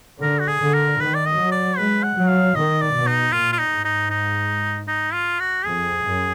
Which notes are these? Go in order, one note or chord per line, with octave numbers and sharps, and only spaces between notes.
D3 A#4
F#4
G#4
D3
A#4
D#3 B4
D5
D#5
F#3
D5
G#3 B4
F#5
F#3
F5
D#3 D#5
D5
B2
D#4
A#2 F4
F4
D#4
G#2
D#4
D#4
D#4
F4
F#4
F2 G#4
F#2